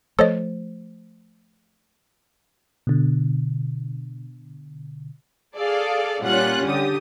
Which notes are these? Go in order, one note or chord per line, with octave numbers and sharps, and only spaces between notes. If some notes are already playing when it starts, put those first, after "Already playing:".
F3 A3 A4 C5 C#5 D#5
B2 D3
G#4 A4 D5 F5
A#2 G3 C#4 F4 F#5 F#6
D3 G4 D#6